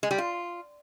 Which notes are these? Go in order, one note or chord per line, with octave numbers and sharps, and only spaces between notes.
G#3
G3
F4